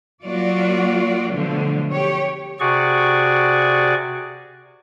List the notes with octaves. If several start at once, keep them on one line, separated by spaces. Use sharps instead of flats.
F#3 A#3 F4 F#4 D5
B2 D3 F3 F#3 A3
G4 C#5
C3 F#4 G#4 D5 C#6